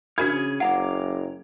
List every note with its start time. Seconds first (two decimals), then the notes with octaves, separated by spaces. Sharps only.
0.18 C#3 D4 F#4 G#4 B5 F6 G#6
0.60 F#1 F5 F#5 A#5 D6